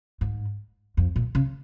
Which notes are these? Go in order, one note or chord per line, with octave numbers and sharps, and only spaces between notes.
G#2
F2
A#2
C#3